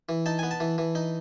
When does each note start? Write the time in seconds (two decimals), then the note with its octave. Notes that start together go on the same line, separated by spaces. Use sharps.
0.09 E3
0.26 D#4 A5
0.39 B3 G#5
0.51 A5
0.60 E3
0.78 E3
0.95 D#4